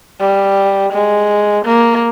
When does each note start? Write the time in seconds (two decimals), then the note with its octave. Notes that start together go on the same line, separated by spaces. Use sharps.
0.20 G3
0.93 G#3
1.65 A#3